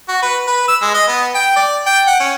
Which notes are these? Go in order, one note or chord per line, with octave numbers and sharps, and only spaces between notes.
F#4
B4
B4
E6
G#3
D#5
B3
G5
D5
G5
F#5
C#4